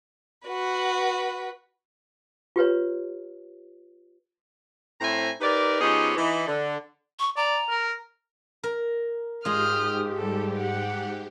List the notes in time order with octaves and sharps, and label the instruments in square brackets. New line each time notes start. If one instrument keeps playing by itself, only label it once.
[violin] F#4 B4
[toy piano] F4 G4 B4 C#5
[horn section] A2 C4 E4 C5 G#5 A#5
D#4 G4 A#4 B4 D5
F3 B3 C#4 D#4 G4 G#4
E3 D#4
D3
[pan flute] C#6
[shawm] D5 [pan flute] A#5
[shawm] A#4
[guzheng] A#4
[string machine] G#2 G4 [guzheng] G#3 F4 [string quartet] D#6 F6 G6
[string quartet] G3 A4
F#5